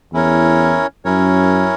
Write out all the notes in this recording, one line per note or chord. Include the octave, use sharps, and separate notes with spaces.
E2 C#4 E4 A#4 C#5
F#2 C#4 E4 A#4 C#5